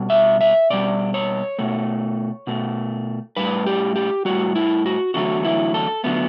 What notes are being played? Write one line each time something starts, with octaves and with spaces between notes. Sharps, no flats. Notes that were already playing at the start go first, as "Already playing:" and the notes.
Already playing: B2 G3
E5
E5
B2 G3 D5
C#5
B2 A3
B2 A3
A2 G3 B4
G4
G4
A2 G3 F#4
E4
F#4
E2 D3 F#3 A3 F#4
E4
A4
D3 F#3 A3 B3